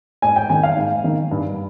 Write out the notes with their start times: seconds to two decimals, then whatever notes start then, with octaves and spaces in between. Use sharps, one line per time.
0.22 G#2 G#5
0.36 G5
0.50 D#3 G#5
0.63 F5
0.77 G#2
1.04 D#3
1.31 G2